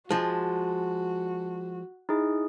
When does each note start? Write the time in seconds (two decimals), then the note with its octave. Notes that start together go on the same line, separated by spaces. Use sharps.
0.11 F3 G#3 F#4 A5
2.09 D#4 E4 G#4